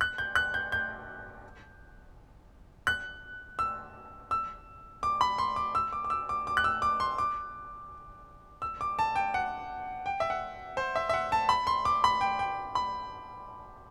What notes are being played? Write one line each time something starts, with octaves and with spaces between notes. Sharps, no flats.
F#6
G6
F#6
G6
G6
F#6
E6
E6
D6
B5
C6
D6
E6
D6
D6
E6
D6
D6
F#6
E6
D6
C6
D6
E6
D6
A5
G5
F#5
G5
E5
F#5
C5
E5
E5
F#5
A5
B5
C6
D6
B5
G5
G5
B5